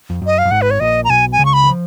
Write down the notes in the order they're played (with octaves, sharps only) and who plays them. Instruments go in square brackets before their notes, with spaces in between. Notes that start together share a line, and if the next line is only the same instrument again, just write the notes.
[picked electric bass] F2
[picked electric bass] F#2 [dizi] D#5
[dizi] F5
[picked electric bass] F#2
[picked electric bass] G#1 G#2 [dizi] F#5
[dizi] B4
C#5
[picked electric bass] A#1 A#2 [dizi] D#5
[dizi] A#5
[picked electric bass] B1 B2 [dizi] G#5
[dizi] G#5
[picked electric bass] C#2 C#3
[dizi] C#6
B5
[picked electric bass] D#3
F3